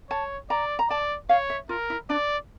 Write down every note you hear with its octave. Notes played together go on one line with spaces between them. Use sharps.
C#5 A5
D5 A#5
A#5
D5 A5
C#5 F5
E5
F4 A#4
E4
D4 D5